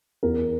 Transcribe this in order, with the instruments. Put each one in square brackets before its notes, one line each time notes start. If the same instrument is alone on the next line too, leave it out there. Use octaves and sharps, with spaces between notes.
[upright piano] E2 A#4